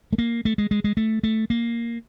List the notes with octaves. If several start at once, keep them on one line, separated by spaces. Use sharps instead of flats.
A3
A#3
A3
G#3
G#3
G#3
A3
A3
A#3